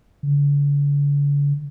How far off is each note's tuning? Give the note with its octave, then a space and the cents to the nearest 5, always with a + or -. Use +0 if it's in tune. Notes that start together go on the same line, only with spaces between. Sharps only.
D3 -45